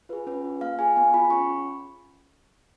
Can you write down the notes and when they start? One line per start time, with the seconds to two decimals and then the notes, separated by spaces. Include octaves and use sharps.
0.09 F4 G#4 B4
0.27 C#4 B4
0.44 F4 G#4
0.61 A#3 F5
0.79 F4 G#4 G#5
0.96 B3 G#5
1.14 F4 G#4 B5
1.30 C#4 C#6